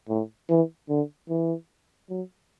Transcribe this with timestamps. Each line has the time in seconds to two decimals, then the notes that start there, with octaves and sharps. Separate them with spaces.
0.09 A2
0.50 E3
0.89 D3
1.29 E3
2.10 F#3